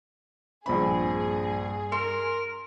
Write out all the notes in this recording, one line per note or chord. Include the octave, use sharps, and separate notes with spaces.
A#1 G2 C4 G#4 B5
A#4 C6